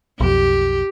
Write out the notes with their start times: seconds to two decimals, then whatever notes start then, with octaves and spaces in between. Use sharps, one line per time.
0.20 B1 F2 G4